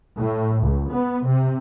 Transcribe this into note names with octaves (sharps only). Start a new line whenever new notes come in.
A2
C#2
B3
C3